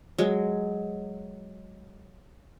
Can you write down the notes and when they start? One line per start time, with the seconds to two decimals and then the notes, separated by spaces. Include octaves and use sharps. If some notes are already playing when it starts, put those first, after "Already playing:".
0.18 F#3 G#3